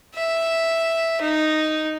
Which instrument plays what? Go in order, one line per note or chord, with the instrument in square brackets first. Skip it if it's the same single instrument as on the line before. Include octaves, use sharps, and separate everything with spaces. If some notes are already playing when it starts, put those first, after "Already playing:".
[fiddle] E5
D#4